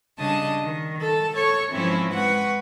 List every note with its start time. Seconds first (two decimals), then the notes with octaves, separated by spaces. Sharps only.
0.18 C#3 G3 D4 D#5 A5 D#6
0.62 D#3
1.00 A4 A5
1.35 A4 C#5 C#6
1.71 G#2 E3 F3 C4 C#4 E4
2.12 G#3 B4 F#5 C#6